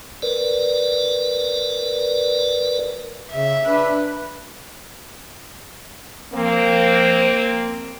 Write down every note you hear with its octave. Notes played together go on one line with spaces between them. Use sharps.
A#4 B4 D5
C#3 E5
D4 B4
F3 A#3 C4